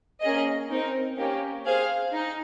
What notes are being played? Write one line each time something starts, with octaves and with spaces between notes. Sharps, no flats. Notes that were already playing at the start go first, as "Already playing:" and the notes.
A#3 C#4 G#4 D#5
C4 D#4 A#4
A#3 C#4 G4
G#4 C5 F5
D#4